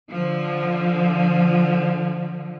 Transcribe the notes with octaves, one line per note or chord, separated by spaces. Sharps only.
D3 F3